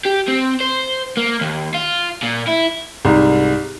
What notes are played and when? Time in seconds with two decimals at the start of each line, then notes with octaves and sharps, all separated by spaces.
0.06 G4
0.28 C4
0.61 C5
1.17 A#3
1.41 D#2
1.74 F4
2.23 A#2
2.48 E4
3.05 C2 G#2